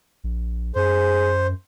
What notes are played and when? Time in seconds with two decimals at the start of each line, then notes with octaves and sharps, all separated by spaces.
0.24 A#1
0.76 F#2 G#4 C5